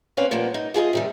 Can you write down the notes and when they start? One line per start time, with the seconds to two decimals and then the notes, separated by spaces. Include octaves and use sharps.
0.17 G3 A#3 C4 C#4 B4 F5
0.31 A#2 F3 G3 A#3 B3
0.54 D#4
0.74 F4 G#4 B4 D#5
0.93 C3 D#3 G3